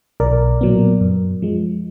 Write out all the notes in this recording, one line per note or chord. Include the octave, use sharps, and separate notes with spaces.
B1 A#4 D5
A#2 F#3 B3
F#2
F3 G#3